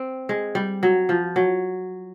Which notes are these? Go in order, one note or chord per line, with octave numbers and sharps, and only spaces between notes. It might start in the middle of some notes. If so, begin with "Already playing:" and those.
Already playing: C4
G#3
G3
F#3
F3
F#3